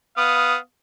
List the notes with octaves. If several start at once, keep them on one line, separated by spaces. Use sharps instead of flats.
B3 F5 D#6